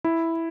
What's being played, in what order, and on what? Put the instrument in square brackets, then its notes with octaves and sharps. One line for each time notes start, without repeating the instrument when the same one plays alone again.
[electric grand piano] E4